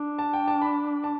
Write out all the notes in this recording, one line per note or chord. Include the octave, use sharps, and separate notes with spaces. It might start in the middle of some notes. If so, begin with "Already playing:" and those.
Already playing: D4
A5
G5
A5
B5
A5